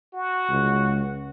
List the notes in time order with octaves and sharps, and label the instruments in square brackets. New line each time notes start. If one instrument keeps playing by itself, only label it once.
[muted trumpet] F#4
[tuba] C#2